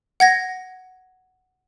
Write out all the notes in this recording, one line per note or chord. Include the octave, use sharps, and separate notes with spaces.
F#5 G#6 A#6